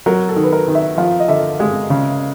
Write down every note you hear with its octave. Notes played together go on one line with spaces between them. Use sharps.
F#3 A#4
A4
D#3
B4
A#4
D#3
E5
F3 F5
D#5
D3 E5
G#3 F5
C#3